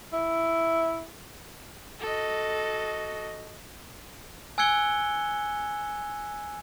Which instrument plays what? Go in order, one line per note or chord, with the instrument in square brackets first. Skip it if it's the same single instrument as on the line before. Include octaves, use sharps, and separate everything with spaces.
[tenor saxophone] E4
[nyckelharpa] F#4 D#5 [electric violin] A4
[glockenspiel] G#5 E6 F#6 G#6 C#7 G7